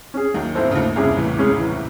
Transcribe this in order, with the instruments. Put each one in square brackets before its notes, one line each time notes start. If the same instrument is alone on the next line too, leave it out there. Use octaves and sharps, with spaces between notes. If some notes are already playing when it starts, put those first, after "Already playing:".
[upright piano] C#4 G#4
[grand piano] D#2 D#3 [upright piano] F#3
[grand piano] G#2 G#3 [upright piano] C4 E4 A4 C5
[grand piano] C#3
[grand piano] D#2 D#3 [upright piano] A3
[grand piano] C2 C3 [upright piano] C#4 E4 G#4
[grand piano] A2 [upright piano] E3
[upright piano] G#3 C#4 G#4
E3